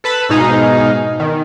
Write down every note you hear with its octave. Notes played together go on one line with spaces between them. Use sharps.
A4 B4 A5 B5
G#2 B2 D#4 G#4 F5
D#3